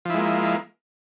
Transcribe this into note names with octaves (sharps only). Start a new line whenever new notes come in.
F3 G#3 A#3 E4